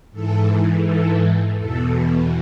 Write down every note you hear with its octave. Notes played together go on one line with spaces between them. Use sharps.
G#2 E3 A4
A4
E2 B2 A4